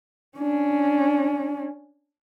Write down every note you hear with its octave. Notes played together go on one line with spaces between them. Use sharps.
C#4 D4